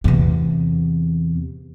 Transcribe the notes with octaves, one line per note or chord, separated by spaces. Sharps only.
E2 C3